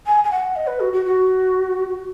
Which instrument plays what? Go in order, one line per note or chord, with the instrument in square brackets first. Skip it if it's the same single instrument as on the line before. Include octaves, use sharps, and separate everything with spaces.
[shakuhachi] G#5
G#5
F#5
D#5
B4
F#4
F#4
F#4